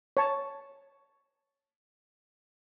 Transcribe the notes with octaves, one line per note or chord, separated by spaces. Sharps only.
C#5 A5